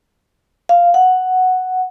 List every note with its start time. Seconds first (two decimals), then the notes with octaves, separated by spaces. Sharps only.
0.69 F5
0.94 F#5